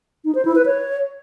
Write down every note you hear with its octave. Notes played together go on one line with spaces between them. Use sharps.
D#4
C5
E4
B4
C#5